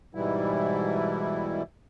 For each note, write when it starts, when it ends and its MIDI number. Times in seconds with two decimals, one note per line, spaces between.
0.15 1.63 44
0.15 1.63 47
0.15 1.63 52
0.15 1.63 55
0.15 1.63 64